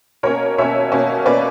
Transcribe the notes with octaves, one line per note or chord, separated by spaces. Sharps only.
B2 A#3 C#4 A#4 C#5
B2 A#3 C#4 C#5 E5
B2 A#3 C#4
B2 A#3 C#4 B4 D5